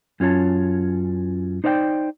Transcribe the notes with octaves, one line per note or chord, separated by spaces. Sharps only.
F#2 C#4 F4 C#5 A5
D#4 C5 D5 F5 G5